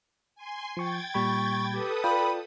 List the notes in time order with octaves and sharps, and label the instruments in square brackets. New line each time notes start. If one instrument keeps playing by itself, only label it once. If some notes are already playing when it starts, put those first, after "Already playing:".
[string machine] G#5 C6
[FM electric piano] F3 C#6 [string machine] G5 G#6 A6
[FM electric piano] A#2 G3 B5 [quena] C#6
[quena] G4 [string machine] A4 B4 D#6
[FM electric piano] F4 D5 G5 [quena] B5